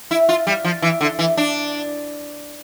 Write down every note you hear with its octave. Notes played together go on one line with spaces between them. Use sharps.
E4
F4
G3
F3
E3
D3
E3
D4